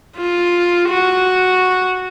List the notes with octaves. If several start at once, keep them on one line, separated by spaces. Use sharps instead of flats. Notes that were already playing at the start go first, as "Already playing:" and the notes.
F4
F#4